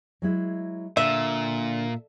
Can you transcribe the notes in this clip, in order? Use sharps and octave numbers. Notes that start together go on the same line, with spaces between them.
F#3 G#3 E4
A#2 D3 E5